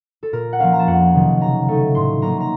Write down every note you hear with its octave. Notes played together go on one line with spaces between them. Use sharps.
A4
A#2 A#4
F#5
F3 A#3 C#4 F5
A#5
A5
F2 F#5
C3 D#3 F#3
C#3 A#5
A3 D#4
A2 C6
F#3 A#3 D#4 A#5
A#5